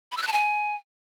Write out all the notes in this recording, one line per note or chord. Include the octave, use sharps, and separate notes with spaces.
B5
E6
F#6
A5
G#5